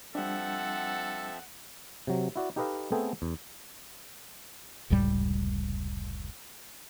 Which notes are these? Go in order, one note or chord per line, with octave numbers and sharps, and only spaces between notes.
F3 G3 C4 D4 A4 E5 F#5
C3 F#3
E4 F#4 D5
D#4 G4 A4 B4 D#5 F5
A3 B3 C4 G#4 A4 G5
E2
F1 C#2 A2 G3